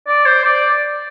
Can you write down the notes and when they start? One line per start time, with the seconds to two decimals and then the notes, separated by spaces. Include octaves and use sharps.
0.07 D5
0.25 C5
0.45 D5